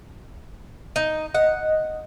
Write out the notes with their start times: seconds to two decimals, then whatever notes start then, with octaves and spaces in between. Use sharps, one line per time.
0.96 D#4
1.34 D#5 F#5